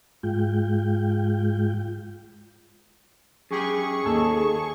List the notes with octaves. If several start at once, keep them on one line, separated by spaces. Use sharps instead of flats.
G#2 G#3 F4 G5
F#2 G4 G#4 C#6
D#2 A4